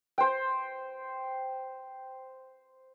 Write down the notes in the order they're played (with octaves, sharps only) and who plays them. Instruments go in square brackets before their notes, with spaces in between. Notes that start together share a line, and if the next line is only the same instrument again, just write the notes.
[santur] C5 G5